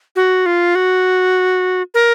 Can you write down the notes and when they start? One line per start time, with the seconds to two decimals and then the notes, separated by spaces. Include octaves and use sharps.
0.16 F#4
0.46 F4
0.75 F#4
1.94 A#4